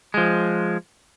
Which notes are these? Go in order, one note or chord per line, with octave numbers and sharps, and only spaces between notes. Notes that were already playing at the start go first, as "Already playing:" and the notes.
F3 G#3